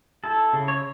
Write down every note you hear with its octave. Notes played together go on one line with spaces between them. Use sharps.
E4 A4
C#3
C#5